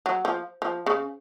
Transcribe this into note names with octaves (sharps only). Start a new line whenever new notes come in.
F#3
F3
F3
C#3